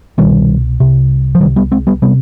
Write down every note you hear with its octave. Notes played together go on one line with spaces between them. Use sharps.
C2 B2 D#3 G3
C2 C3
F3
C2 C3 D#3 G3
G3 B3
G#3 C4
G3 B3
C3 G3 B3